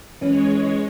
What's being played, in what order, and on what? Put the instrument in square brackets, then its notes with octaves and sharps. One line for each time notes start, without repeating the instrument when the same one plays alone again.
[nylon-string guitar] E3 C#4 [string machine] G#3 C#5